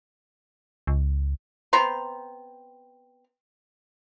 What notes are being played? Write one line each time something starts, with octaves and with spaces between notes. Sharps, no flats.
C#2
B3 C4 A#5 C6